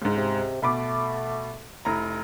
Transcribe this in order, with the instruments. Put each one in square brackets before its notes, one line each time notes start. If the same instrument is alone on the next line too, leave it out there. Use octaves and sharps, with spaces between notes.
[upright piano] C#2 G#2
[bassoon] C3
[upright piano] B2 B5 D6 [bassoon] A3
[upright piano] F1 E4 A#5